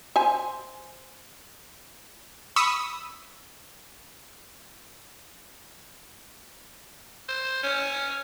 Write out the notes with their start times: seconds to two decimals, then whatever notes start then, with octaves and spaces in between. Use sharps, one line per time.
0.16 C5 E5 G#5
2.56 B5 C#6 D#6 E6 B6
7.29 C5
7.63 C#4